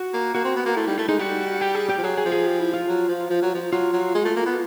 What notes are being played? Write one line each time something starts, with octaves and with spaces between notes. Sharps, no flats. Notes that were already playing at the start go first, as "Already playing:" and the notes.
Already playing: F#4
A#3
A#3 F#4
C4
B3
A#3
A3 E4
G3 D#4
A3 E4
G#3 D#4
G3 F#4
G4
G#4
G4
F3
F#3 G#4
G#4
F3
G#4
G4
E4
F4
F#3
F3
F3
F#3
F3
F#3 F4
F#3
G#3
A3
A#3
B3